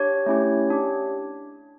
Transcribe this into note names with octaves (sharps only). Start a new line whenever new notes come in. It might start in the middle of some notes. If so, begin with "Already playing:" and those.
Already playing: D4 G4 C#5
A3 C#4 E4 G4
D4 G4